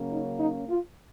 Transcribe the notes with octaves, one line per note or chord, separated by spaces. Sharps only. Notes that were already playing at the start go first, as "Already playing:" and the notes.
Already playing: C#3 F#3 A#3 C#4
D#4
D#4
F4